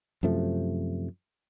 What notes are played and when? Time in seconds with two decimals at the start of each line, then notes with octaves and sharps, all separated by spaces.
0.23 F#2 C3 F3 A3